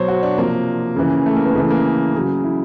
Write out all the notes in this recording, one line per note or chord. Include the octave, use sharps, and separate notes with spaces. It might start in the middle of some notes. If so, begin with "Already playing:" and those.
Already playing: B2 F#3 C5 C#5
F#4
D4
C3 F3 A#3
C#3 E3
A3
A#3
B3
C#3 E3 A3
A#3
C#3 F#3
E4